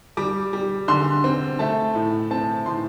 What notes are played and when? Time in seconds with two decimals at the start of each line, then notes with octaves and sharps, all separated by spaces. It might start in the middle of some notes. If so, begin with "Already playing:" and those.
0.17 G3 D6
0.53 G3
0.88 D3 C6
1.24 C4
1.59 A3 A5
1.95 A2
2.31 C4 A5
2.66 A2 C6